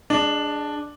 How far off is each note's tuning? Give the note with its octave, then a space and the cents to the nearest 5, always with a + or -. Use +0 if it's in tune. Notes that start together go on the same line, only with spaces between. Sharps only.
D4 +0 G#4 +0 D#5 -30